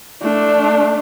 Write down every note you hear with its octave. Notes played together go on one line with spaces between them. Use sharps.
A3 D4